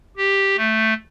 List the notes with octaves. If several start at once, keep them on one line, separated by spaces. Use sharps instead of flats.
G4
A3